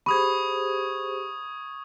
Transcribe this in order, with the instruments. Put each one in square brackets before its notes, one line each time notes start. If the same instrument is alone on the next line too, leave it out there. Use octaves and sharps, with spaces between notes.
[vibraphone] G4 G#4 C5 [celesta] B5 [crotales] C#6 D#6 G#6